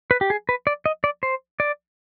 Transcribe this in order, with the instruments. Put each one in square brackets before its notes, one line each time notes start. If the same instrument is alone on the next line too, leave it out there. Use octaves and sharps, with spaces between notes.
[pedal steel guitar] B4
G4
G#4
B4
D5
D#5
D5
C5
D5